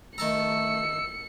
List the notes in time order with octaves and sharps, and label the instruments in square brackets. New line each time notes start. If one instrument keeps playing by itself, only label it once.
[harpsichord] D#3 A5 A#5 [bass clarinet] A3 [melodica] E6 [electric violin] C#7